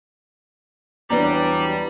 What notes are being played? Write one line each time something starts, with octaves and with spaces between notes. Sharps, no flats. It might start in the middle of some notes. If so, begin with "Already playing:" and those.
E2 F#3 G3 D4 B4 D5 A#5